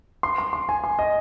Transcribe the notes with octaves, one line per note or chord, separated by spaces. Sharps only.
C6
C6
C6
G#5
C6
D#5